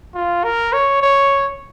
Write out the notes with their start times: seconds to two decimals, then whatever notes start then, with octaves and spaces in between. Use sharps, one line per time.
0.15 F4
0.44 A#4
0.73 C#5
1.02 C#5